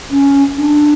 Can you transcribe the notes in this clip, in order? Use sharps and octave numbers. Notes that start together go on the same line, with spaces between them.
C#4
D4